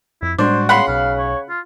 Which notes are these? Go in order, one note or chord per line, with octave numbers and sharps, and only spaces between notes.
F2 E4
A2 G3 G#3 D4 F#4 C5
C#3 F#5 B5 C6
B1 B2 F5
C#5
F4